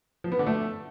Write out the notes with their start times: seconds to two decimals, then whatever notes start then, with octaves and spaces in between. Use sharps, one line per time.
0.24 F3
0.32 B3
0.39 D3
0.47 A3